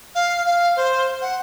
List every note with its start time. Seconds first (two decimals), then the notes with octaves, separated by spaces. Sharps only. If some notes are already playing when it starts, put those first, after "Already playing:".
0.15 F5
0.45 F5
0.76 C5
1.21 F#5